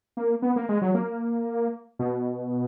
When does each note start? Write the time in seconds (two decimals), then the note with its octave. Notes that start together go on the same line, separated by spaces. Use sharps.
0.17 A#3
0.42 B3
0.56 A#3
0.69 G#3
0.82 F#3
0.94 A#3
1.99 B2